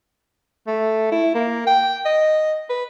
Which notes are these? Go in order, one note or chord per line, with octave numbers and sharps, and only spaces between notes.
A3
E4
A#3
G5
D#5
B4